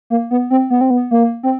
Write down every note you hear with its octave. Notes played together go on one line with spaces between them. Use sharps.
A#3
B3
C4
B3
C4
B3
A#3
C4